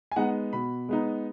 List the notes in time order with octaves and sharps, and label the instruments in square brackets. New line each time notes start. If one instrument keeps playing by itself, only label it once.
[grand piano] G#5
G#3 B3 D#4 F#5
B2 B5
G#3 B3 D#4